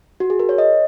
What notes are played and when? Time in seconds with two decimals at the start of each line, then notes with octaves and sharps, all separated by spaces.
0.20 F#4
0.30 G#4
0.40 A#4
0.49 C#5
0.58 D#5